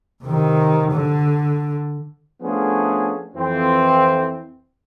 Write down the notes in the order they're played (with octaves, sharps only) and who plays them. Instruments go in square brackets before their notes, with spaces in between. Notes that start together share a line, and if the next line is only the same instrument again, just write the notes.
[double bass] C3 D#3
D3
[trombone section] F3 A3 B3 C#4 D4 G#4
F2 E3 C4